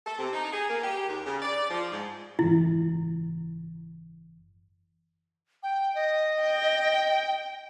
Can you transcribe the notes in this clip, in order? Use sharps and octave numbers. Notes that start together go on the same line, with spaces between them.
A4
C3
D#4
G#4
A#3
G4
D#2
C#3
D5
F3
G#2
F#1 G#2 E3 E4
G5
D#5
G5